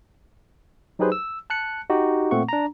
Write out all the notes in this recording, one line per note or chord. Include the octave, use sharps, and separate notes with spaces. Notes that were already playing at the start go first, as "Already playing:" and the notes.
F#3 D#4 G4 G#4 B4 C5
E6
A5 F#6 C#7
D#4 F#4 G4
A#2 A3 C4 F#5 C#6
D4 A#5